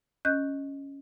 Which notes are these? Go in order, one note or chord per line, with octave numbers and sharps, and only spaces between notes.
C#4 D#5 F#6 G6